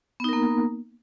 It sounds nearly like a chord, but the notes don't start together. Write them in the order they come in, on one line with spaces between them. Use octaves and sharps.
B3 D#4 A#4 A#3